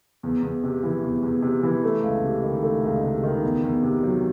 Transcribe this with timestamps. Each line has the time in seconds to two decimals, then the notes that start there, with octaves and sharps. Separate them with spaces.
0.23 E2
0.43 E2
0.64 C3
0.83 E3
1.03 E2
1.23 E2
1.42 C3
1.63 E3
1.84 A3
2.03 C#2
2.23 C3
2.43 D#3
2.63 A3
2.84 C#2
3.03 C3
3.23 D#3
3.43 E2
3.63 E2
3.83 C3
4.03 F#3